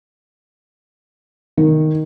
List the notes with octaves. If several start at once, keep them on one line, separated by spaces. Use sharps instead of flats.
D#3